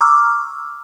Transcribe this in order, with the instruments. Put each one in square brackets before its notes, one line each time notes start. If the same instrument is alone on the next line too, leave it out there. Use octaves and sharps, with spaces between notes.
[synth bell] A#5 C#6 D6 E6 F6